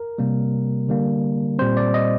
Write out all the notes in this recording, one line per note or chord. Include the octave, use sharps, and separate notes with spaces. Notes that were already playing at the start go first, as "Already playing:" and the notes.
Already playing: A#4
C3 G3 A#3
D3 G3 A#3
A#2 G3 C4 C5
D5
D#5